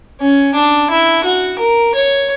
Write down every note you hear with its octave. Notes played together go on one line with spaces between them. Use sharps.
C#4
D4
E4
F#4
A#4
C#5